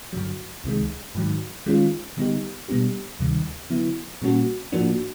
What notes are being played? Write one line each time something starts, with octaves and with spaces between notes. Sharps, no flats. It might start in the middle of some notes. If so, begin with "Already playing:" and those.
G2 D3 F#3
C#2 C3 D#3 G#3
G#2 D#3 F#3
D#3 G#3 C#4 F4
D3 G3 B3 D#4 G4
B2 G3 B3 D4 G4
D2 C3 D#3 G3
D3 F#3 B3 E4
A#2 G3 A#3 C#4 F#4
A2 F3 A#3 D4 F#4